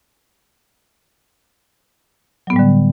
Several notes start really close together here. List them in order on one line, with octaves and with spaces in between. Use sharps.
F#3 B3 A2 G3 D3